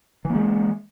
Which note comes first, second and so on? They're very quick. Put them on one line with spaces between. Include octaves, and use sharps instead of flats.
E3 A#3 G#3